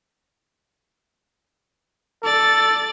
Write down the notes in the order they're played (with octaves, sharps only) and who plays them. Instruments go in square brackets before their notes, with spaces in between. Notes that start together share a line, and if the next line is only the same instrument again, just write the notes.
[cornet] A4 [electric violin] D5 A6